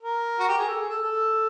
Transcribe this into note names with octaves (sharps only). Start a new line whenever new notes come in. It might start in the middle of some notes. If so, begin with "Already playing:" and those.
A#4
F#4
G4
G#4
A4
G#4
A4
A4